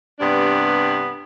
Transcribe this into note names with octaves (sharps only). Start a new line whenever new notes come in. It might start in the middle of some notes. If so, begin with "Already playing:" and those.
G2 C3 B3 D4